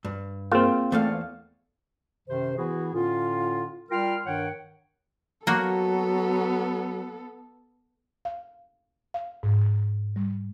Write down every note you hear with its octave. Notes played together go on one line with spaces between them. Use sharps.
G2
A#3 C4 F4 G#4 A#4
E2 A3 F5
F#2 C3 D#3 C5
E3 B3 E4 F#4 G#4
A2 D3 C#4 F4
G3 F4 A#4 G5 C6 F6
G2 D#3 C#5 F#5 G5
F#3 A#3 B3 F#4 A4
F5
F5
G#2
G3